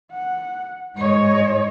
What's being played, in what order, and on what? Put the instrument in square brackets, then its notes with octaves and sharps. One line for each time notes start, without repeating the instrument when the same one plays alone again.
[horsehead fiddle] F#5
[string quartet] G#2 [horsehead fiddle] C#5 D#5